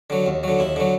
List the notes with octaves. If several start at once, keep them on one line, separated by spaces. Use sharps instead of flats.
D3 F#3
D#2
D3 F#3
D#2 E4
D3 F#3